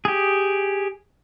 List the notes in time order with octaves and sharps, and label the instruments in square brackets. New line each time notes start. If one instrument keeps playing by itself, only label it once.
[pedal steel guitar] G4 G#4